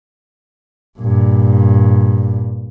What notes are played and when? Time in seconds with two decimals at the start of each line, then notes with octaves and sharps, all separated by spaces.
0.99 G2 A#2